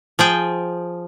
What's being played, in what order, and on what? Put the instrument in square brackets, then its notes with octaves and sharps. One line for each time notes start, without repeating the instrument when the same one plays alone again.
[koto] F3 G#4 G5